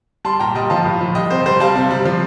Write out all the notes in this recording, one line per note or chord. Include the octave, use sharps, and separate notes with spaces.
G3 A5 C6
A#2 G5 A#5
G3 D#5 G5
F3 F5 A5
A2
F3
G3 D#5 G5
C3 C5
G3 C5
G3 F5 A5
C3
G3
F3